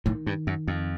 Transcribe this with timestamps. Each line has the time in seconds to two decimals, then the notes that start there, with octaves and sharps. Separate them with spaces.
0.06 A2 D#3
0.27 G2
0.47 F#2
0.68 F2